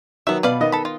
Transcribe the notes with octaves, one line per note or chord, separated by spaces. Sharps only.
D#3 F#3 B3 E5
B2 B4 D5 F5
D#3 B3 D#5
A4 B5
F4